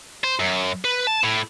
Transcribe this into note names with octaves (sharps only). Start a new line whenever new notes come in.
C5
F#2
B4
A5
A2